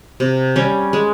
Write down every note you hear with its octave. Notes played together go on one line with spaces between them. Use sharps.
C3
G3 C#4
G#3